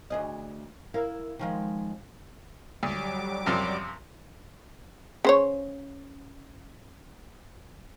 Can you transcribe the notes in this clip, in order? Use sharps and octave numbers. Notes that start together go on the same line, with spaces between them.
D2 G#4 D#5
E4 A#4 F5
D#3 F3 G#3
D2 F#3 G3 D6
F#2 C3 F3
C#3 C5 C#5